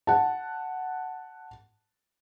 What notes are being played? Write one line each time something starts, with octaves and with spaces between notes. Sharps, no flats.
F#5 A5